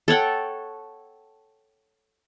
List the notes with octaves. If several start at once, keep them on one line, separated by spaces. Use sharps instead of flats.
A4 C#5 F#5 G5